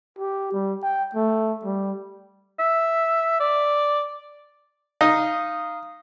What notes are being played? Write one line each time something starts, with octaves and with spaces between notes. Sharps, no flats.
G4
G3
G5
A3
G3
E5
D5
D#4 F5 D#6